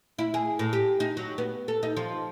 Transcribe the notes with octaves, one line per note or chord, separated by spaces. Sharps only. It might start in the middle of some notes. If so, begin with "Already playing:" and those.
E4
G#4
A2
G4
D#4
F#3
B3
A4
D#4
F3